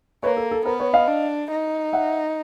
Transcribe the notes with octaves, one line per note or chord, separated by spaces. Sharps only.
A#3 B4 C#5
A4
A4
B3 A#4 C5
B4 C#5
D#5 F5
D4
D#4
E5 F#5